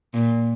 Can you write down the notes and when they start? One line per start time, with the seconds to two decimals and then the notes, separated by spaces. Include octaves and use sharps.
0.14 A#2